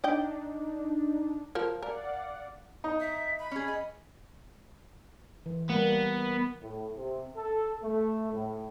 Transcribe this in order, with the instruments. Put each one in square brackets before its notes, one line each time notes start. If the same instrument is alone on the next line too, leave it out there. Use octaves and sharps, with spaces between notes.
[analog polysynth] D4 D#4 [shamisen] D5 D#5 G5
[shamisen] F3 F4 A#4
[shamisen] A#4 [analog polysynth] D5 F5 F#5
[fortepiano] D#4
[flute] E5
B5
[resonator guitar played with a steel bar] C#4 G#4
D#5
[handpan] E3
[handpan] G3 A#3 [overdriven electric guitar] B3
[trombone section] A2
C3
A4
A3
A2